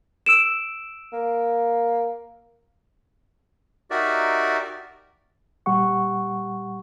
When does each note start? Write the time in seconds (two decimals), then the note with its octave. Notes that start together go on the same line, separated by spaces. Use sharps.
0.26 E6 D7 E7
1.13 A#3
3.91 D#4 F#4 G4 A#4 D5 E5
5.66 A#2 G3 G4 F#5 C#6